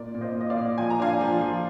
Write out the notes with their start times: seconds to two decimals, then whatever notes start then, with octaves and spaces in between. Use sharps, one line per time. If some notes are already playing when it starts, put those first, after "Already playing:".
Already playing: A#2 A#4 D5
0.14 A#2
0.21 C5 D#5
0.35 A#2
0.41 D#5
0.50 D5 F5
0.57 A#2
0.78 F3 G#5
0.90 A#5
1.00 D4 F5 G#5
1.21 F3
1.41 F3